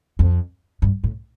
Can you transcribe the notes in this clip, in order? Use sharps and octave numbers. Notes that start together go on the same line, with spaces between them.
F2
G2
A2